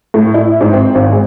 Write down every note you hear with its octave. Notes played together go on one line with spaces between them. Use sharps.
A2
E4
G#2
C4
G#1
G#3